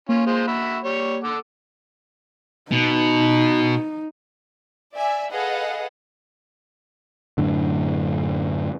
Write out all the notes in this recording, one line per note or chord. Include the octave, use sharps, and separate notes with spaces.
A#3 C#4 F4
G#3 F4 C5
F#4 E5 B5
G3 C#5
A4 F#5 D6
B2 D#4
D5 E5 G#5
G#4 A4 B4 D#5 F5 F#5
F#2 A2 D3